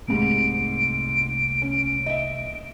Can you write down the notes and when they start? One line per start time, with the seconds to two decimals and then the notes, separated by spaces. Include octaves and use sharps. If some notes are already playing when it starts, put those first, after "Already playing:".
0.08 C2 G#2 C3 A3 A#3 D7
1.62 C#4
2.06 D#5 E5